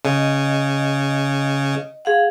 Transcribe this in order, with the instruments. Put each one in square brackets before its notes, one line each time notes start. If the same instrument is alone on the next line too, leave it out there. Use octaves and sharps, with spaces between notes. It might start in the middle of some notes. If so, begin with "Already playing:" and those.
[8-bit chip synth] C#3 [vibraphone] D#5
[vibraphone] G#4 F5 F#5